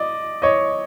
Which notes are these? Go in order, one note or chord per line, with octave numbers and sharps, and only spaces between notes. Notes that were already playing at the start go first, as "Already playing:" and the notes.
Already playing: D5 D#5
C#5 D#5